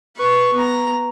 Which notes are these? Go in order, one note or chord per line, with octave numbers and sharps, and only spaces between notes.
B4 C#6
B3 A#5